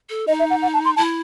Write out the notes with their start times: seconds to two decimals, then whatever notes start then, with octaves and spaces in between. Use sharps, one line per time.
0.10 A4
0.27 D#4 D#5
0.39 E5
0.50 F#5
0.62 F#5
0.74 A5
0.85 C6
0.96 E4 A5